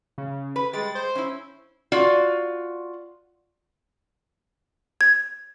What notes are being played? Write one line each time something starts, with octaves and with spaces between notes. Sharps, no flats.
C#3
B4
G3 G#3 A6
C5
C#4 E4
F4 F#4 D5
G#6